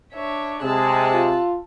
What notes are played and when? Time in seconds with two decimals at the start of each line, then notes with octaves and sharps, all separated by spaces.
0.14 D4 C#5 E5
0.63 C3 G#3 G#4 A5 E6 F#6
1.14 F4